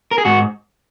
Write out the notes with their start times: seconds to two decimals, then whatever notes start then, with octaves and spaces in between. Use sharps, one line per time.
0.11 A#4
0.18 G#4
0.25 G#2 F#4